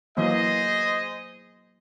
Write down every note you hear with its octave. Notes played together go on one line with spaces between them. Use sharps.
E3 F#3 A#3 G#4 C5 D#5